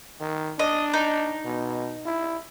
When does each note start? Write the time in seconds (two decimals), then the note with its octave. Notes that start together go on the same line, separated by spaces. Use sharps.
0.21 D#3
0.59 D4 D#5
0.93 D#4
1.45 B2
2.06 E4